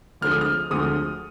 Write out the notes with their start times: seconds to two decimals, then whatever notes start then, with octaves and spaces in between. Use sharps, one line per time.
0.21 D2 D3 F3 G#3 F6
0.31 D#6
0.41 F6
0.70 D2 D3 F3 G#3 D#6